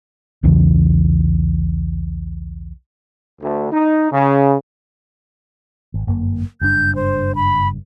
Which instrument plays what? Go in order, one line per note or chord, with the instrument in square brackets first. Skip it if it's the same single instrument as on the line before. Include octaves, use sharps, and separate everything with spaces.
[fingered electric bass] B1 E2 C#3 E3
[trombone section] D2
D#4
C#3
[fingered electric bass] G#1
G1 F#2 A#3
[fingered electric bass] F#1 G2 D4 [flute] G6
[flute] C5
B5